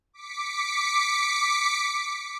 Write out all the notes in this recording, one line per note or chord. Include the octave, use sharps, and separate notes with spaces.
D6 B6 C#7